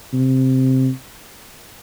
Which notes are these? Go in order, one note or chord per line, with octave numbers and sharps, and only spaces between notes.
C3